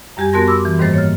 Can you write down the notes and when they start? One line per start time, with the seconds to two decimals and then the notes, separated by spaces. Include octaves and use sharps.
0.17 F#2 G3 G4 G#5 G#6
0.33 B3 F#4 A#4 A5 C6 A#6
0.47 B5 C6 D6 E6
0.65 E3
0.79 G#2 D#3 G3 A#3 C5 A6
0.94 C#5 F6